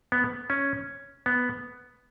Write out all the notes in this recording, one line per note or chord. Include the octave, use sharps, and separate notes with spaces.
B3
C#4
B3